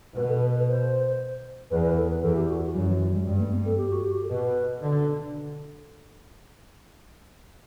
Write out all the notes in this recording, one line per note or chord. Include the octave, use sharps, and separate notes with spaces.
B2 B4
A4
B4
B4
C5
E2 B4
B4
A4
B4
E2 A4
G4
F#4
F#2 F#3
E3
F#3
G3
G2 G3
A3
B3
A4
G4
F#4
G4
A4
B2 B4
D3